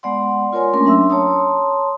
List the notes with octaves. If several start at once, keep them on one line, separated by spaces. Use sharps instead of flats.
G#3 B3 D5 F#5 C6
F4 A#4 C#5 G#5 C6
A3 A#3 C#4 D4 A#4 C6
F#3 D4 E5 C6 E6
C#5 A5 A#5 C6 D#6